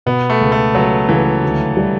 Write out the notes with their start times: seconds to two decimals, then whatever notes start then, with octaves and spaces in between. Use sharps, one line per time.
0.06 B2 B3
0.30 A3
0.41 C#2
0.52 A3
0.75 C#2 F#3
1.09 C#2 E3
1.43 D2
1.77 G3